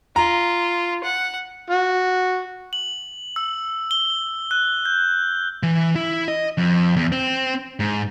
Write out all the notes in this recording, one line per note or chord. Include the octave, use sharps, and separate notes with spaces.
F4 A#5
F#5
F#4
F#7
E6
G7
F#6
G6
E3
E4
D#5
F2
E2
C4
G#2